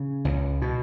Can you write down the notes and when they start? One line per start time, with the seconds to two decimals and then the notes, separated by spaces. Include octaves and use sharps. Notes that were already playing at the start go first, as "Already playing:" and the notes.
Already playing: C#3
0.25 C#2
0.62 B2